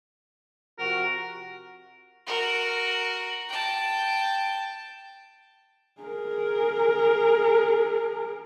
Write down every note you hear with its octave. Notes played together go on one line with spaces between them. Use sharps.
C3 F3 F#4 A#4
F#4 A#4
G5 A5
G#4 A#4